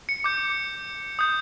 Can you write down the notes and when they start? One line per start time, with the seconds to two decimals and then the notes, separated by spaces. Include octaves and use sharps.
0.09 C#7
0.24 D6 G6
1.19 D#6 G6